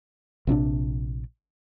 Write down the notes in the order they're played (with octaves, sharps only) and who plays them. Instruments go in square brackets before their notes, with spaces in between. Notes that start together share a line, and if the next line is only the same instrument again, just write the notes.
[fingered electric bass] A#1 C3 C#4 D4